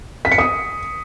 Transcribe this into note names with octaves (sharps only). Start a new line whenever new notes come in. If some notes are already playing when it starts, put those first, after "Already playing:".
B6
C#7
D#6